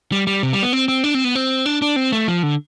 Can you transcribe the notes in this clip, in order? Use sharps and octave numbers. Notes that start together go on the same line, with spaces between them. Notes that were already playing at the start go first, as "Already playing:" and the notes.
G3
G3
C3
G3
B3
C4
C4
D4
C4
B3
C4
D4
D4
C4
A3
F3
D3